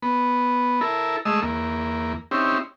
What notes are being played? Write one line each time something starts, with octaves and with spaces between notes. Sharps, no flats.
B3
E4 A4 A#4
G#3 A3 D#5 E6
E2 A#3
C4 C#4 D#4 E4 G4